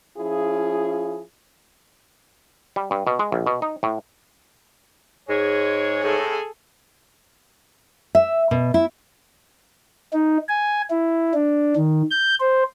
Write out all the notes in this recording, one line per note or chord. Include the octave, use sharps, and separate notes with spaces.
F3 C#4 E4 F4 G#4
G3
G2
B2
G#3
A#1
B2
D#4
A2
G#2 G#3 C#5
A2 C3 G#4 A4
E5
B2
E4
D#4
G#5
E4
D4
D#3
G6
C5